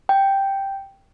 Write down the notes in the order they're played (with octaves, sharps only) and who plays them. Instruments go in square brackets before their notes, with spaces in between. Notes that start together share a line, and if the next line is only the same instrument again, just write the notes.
[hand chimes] G5